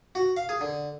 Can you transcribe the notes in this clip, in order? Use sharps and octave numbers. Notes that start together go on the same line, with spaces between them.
F#4
F5
G#4
D3